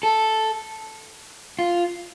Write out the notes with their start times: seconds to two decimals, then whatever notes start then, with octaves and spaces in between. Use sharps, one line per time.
0.03 A4
1.59 F4